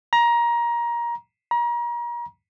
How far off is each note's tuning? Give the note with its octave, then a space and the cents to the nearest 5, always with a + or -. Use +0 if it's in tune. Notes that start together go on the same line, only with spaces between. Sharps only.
A#5 +20
A#5 +35